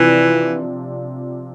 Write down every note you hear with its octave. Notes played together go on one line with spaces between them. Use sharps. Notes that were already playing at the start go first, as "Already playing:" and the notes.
Already playing: C3 E3 F3 D4